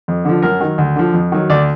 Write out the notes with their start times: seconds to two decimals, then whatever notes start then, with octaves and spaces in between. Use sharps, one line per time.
0.08 F2
0.25 D3 F3
0.42 F#2 A#4
0.60 D#3 F#3
0.78 D2
0.96 D3 F3
1.14 F2
1.32 D#3 F#3
1.50 D2 D5